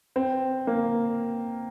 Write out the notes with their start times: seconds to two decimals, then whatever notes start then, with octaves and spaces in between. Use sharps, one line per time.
0.16 C4
0.67 A#3